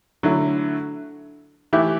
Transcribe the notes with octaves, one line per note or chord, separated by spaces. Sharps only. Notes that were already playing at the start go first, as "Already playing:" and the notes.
D3 F#3 A3 E4
E3 A3 E4 G4